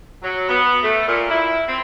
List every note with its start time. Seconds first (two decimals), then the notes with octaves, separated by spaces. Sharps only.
0.23 F#3
0.48 B3
0.83 A3
1.07 A#2
1.30 E4
1.67 C4